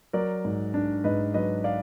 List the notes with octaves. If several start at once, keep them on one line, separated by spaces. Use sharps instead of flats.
F#3 A#4 D5
G#2
D4
G#2 B4 D#5
F#3 B4 D#5
D5 F5